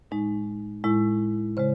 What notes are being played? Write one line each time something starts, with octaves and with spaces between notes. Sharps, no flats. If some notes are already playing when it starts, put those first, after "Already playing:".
A2 G#3 D#4
A2 G#3 E4
C#3 G#3 C5